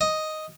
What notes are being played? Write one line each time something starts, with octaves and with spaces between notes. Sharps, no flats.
D#5